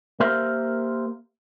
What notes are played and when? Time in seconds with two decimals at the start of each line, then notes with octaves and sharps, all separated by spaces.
0.20 A#3 G4 A#4 C5 E5 F5